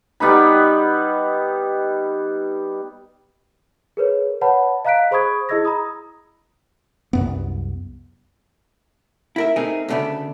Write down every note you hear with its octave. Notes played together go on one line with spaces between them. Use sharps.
G3 B3 D#4 B5
G#4 A#4 B4 C#5
B4 C#5 F#5 A5 B5
D#5 F5 A#5 F#6 B6 D7
G#4 C5 B5 C#6 D#6 G#6
E4 G#4 D#5 E6 G#6 A#6
A#5 B5 D#6
C2 F#2 B3
E4 A#4 E5
A3 C4 D#4 G#4 A#4
D2 C#3 A3 B3 D4